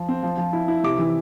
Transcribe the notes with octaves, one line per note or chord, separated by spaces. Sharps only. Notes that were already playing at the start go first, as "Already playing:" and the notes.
Already playing: F3
C4
F3
F3
E4
E4
C3 D6
E3